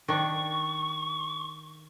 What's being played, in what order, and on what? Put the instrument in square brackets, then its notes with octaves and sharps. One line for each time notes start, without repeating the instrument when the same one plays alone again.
[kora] D#3 D4 [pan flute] C#6